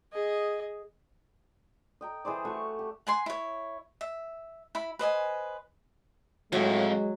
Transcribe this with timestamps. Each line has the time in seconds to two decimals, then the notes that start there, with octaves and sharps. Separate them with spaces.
0.13 G#4 D#5
2.01 D#5 G5 A#5
2.25 E3 G#4 C5 D5
2.45 A3 F#4 C#6
2.79 G4
3.07 F#5 G#5 C6
3.26 E4 C#5
4.01 E5
4.75 E4 B5
4.99 B4 C5 D#5 G#5
6.52 F2 A2 F#3 G#3